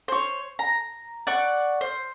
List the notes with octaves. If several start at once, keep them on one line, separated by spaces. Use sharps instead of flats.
C5 C#5
A#5
D5 F#5 C#6
C5